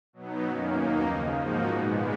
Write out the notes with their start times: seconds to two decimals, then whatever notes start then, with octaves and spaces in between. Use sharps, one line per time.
0.13 B2 F#3 B3 D#4
0.43 F#2 D#3 A#3 C#4
0.73 D#2 D#3 A#3 D#4
1.04 D#2 C#3 F3
1.35 G#2 F3 A#3 D#4 F#4
1.65 A#2 G#3 B3